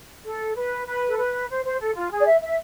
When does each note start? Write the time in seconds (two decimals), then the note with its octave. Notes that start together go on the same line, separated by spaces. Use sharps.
0.25 A4
0.57 B4
0.87 B4
1.08 A4
1.18 B4
1.50 C5
1.65 C5
1.80 A4
1.96 F4
2.11 G#4
2.20 D5
2.26 E5
2.42 E5